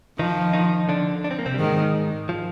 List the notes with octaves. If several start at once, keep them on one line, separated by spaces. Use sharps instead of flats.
D#3 F3 D#4
D#3 D#4
D3 D4
D4
C4
A#3
C3 C4
G3
G#2 D#3 G#3
F3